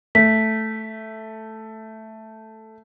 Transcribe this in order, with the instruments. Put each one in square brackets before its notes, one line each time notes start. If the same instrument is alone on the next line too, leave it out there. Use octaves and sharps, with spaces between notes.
[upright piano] A3 [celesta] B6